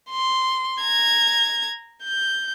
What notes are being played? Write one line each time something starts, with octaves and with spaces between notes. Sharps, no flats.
C6
A#5 G#6
G6